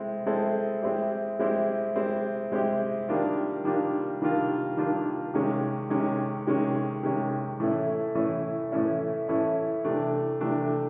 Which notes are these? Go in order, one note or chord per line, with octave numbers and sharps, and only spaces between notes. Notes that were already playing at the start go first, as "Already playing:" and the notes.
Already playing: G#3 C4 E4 A4
G#3 C4 E4 A4
G#3 C4 E4 G4
G#3 C4 E4 G4
G#3 C4 E4 G4
G#3 C4 E4 G4
D#3 G3 A#3 D4 F4
D#3 G3 A#3 D4 F4
D#3 G3 A#3 D4 F4
D#3 G3 A#3 D4 F4
C3 D#3 G#3 C#4
C3 D#3 G#3 C#4
C3 D#3 G#3 C#4
C3 D#3 G#3 C#4
A2 E3 A3 C#4 E4
A2 E3 A3 C#4 E4
A2 E3 A3 C#4 E4
A2 E3 A3 C#4 E4
C3 E3 A3 D4
C3 E3 A3 D4